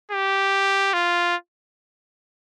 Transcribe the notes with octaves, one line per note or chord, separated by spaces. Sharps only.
G4
F4